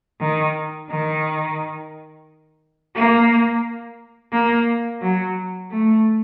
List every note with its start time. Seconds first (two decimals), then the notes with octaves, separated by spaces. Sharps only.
0.20 D#3
0.89 D#3
2.95 A#3
4.32 A#3
5.02 F#3
5.70 A3